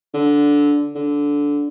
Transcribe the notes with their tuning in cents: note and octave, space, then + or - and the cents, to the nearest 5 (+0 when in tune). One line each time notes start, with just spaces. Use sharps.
D3 -10
D3 -15